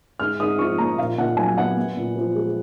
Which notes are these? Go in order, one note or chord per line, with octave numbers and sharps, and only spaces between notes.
G#2 F6
G#2 D#6
F3 C#6
A#3 A#5
A#2 F5
A#2 F#5
F#3 G#5
B3 F#5
B3
A#2
F3
G#3